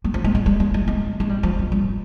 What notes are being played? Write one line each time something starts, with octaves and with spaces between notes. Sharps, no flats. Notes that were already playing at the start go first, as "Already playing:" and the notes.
G3
F3
G#3
G#3
G3
G#3
G3
G#3
G#3
G3
F3
G3
G3